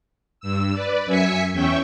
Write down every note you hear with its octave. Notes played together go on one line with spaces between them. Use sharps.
G2 E6
B4 D5
F#2 E5 G#5 B6 C#7
E2 C#4 E5 G5 C#6